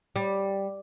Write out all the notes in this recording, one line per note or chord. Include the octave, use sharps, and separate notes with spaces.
G3